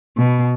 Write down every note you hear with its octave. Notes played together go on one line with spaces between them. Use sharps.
B2